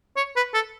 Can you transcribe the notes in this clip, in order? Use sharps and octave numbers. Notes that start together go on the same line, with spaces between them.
C#5
B4
A4